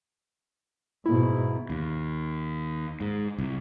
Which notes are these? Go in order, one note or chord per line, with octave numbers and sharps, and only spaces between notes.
G#2 B2 E4
D#2
G#2
C2